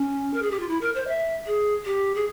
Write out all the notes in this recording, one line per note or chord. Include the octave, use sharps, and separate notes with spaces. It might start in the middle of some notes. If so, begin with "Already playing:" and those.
Already playing: C#4
A#4
G#4
G4
F4
E4
A#4
C5
E5
G#4
G4
G#4